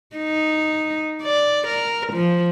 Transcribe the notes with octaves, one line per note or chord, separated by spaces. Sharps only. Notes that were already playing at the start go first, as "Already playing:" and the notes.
D#4
D5
A#4
F3